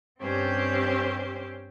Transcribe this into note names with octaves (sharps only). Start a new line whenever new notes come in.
G2 C4 C#4 G4 C5